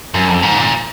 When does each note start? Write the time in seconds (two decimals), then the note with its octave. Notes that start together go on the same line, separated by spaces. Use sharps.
0.14 F#2
0.29 F2
0.42 G#2
0.58 A#2